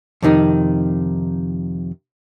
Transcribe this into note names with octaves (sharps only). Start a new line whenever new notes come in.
F2 C3 D#3 D#4